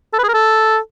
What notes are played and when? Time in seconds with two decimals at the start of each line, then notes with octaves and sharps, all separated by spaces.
0.14 A4
0.19 B4
0.24 G#4
0.29 A#4
0.34 A4